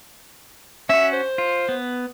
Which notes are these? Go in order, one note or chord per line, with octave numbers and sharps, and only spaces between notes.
C#4 F#4 E5
C5
F4
B3